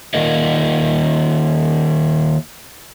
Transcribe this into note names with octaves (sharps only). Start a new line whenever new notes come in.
D#3 A#3 F4 A#4 D5 D#5